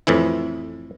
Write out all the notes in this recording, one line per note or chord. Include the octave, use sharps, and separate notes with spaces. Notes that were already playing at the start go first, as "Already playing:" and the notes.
F2 A2 E3 E4